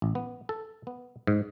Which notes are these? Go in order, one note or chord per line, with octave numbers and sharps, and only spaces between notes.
A1
B3
A4
B3
G#2